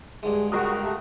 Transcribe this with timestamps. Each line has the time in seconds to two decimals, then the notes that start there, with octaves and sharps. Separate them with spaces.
0.23 G2 D3 G#3 G#4
0.52 C#2 F#4 A#4 D#6
0.83 A3 G4